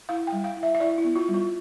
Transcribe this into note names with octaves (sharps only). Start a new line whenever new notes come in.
E4 F5
G5
G3
F5
E4
E5
E5
E4 D5
E4
B3
F4
G3
F4